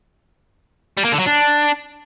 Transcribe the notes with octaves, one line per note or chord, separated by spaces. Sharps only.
G3
A#3
D3
F#3
D4